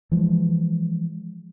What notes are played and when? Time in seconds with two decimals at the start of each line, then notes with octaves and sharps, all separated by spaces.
0.11 E3 F3 G#3